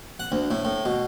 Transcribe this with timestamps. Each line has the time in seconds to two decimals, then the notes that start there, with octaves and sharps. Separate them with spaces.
0.20 F#5
0.32 D2
0.51 A2
0.65 A2
0.85 B2